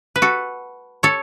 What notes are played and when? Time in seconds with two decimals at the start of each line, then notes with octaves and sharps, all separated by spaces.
0.16 B4
0.22 F#4 A4
1.03 A4 C#5